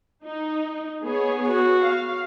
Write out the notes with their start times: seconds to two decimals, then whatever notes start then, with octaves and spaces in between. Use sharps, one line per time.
0.23 D#4
1.02 B3 G#4 C#5
1.47 F#4
1.81 F5